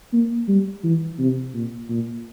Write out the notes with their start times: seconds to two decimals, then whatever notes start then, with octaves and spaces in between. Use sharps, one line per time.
0.13 A#3
0.48 G3
0.84 E3
1.19 C3
1.54 A#2
1.90 A#2